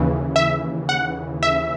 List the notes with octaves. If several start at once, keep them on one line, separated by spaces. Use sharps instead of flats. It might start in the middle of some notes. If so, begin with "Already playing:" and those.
Already playing: D#2 C#3 E3
E5
F#5
E5